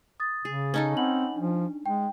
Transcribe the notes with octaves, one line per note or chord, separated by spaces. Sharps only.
D#6 A6
C#3 G#4
C#4 D#4 A4
C4 F#5 B5 F#7
F3 D4
G#3 G5